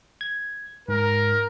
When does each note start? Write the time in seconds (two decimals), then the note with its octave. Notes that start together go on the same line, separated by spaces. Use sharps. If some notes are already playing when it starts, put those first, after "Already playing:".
0.21 G#6
0.88 G#2 A#4